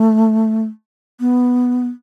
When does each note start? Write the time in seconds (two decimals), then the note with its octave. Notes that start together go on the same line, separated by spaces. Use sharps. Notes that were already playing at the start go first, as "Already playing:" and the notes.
Already playing: A3
1.20 B3